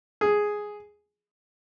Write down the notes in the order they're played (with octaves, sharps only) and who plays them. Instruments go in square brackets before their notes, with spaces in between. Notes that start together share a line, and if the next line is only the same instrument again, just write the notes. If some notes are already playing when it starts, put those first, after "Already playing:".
[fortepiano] G#4